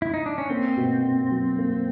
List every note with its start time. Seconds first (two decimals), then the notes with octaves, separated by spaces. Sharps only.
0.02 E4
0.14 D#4
0.26 D4
0.38 C#4
0.50 A#3 C4
0.77 B2
1.04 B2
1.31 F#3
1.59 A#3